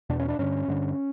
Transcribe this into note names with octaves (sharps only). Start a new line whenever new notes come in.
E2 B2 D4
C#4
D4
G2 D3 C#4
G2 D3